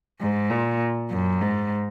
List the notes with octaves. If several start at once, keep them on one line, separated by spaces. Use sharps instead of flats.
G#2
A#2
F#2
G#2